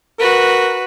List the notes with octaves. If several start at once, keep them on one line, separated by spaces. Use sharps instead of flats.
F#4 A#4 B4